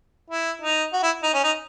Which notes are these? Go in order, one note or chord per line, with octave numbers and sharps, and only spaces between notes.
E4
D#4
F#4
E4
D#4
C#4
D#4